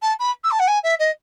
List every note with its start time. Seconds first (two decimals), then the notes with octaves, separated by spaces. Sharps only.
0.02 A5
0.19 B5
0.44 E6
0.51 A5
0.59 F#5
0.67 G#5
0.83 E5
0.99 D#5